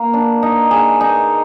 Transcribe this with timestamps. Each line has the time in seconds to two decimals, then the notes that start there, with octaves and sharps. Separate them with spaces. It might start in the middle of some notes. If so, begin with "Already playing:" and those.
Already playing: A#3
0.14 D4
0.43 D#4
0.71 G#4
1.01 D#4